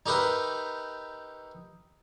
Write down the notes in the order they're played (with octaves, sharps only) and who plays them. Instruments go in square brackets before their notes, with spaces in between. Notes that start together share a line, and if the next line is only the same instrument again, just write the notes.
[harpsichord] D#4 G4 A#4 B4 E5